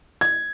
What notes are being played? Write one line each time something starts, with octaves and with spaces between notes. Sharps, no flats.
G#6